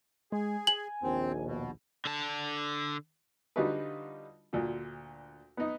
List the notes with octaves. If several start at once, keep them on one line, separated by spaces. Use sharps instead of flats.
G#3 G#4
G#5 F#7
A#1 D#2 C4
B2
D3 A5
D3 G3 D#4 F4 F#4 B4
D2 A#2
B3 D#4